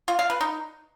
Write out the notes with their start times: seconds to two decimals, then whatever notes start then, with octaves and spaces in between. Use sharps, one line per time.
0.08 F4
0.19 F5
0.30 B4
0.41 D#4